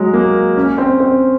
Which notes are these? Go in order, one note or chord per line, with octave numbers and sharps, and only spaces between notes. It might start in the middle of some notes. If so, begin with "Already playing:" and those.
Already playing: F#3 G#3
A#3
C#4
C4
C4